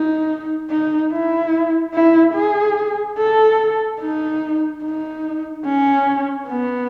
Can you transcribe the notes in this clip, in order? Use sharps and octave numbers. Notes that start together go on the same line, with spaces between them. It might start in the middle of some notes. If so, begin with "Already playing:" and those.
Already playing: D#4
D#4
E4
E4
G#4
A4
D#4
D#4
C#4
B3